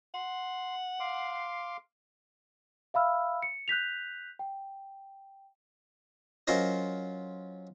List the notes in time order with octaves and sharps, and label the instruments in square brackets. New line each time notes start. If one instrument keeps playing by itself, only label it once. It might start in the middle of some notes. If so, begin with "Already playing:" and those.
[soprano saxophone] F#5 [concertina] C6
[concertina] F5 C6 D6
[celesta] E5 F5 B5 E6 F6
C#7
F#6 G6 B6 F7
G5
[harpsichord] F#3 C#4 F4 A#4 C5 D#5